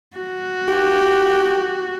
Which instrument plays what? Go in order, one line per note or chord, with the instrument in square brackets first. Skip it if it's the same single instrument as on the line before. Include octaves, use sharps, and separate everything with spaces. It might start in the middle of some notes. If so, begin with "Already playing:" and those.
[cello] F#4
[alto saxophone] G4